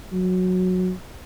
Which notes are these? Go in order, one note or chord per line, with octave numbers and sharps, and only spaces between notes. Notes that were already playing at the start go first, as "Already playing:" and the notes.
F#3